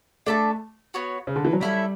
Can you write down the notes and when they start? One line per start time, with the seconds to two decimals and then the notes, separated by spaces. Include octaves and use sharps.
0.26 A3 D4 A4 E5 A5
0.94 B3 F#4 C#5
1.27 C#3
1.36 D3
1.45 E3
1.53 F#3
1.61 G3 C#4 E4 A4 E5